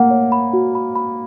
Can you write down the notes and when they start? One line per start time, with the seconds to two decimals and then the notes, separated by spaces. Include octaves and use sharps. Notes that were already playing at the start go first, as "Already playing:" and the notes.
Already playing: A#3 F#5
0.10 C#5
0.32 B5
0.53 F#4
0.75 B5
0.96 B5